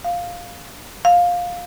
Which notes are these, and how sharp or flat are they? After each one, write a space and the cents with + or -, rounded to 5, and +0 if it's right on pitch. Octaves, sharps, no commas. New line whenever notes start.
F5 +5
F5 +15